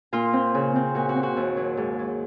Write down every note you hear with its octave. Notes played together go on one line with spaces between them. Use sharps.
A#2 F4
C4
C#3
C4
A#2 F#4
F#4
C4
F#4
D#2
F#3
G#2
F#3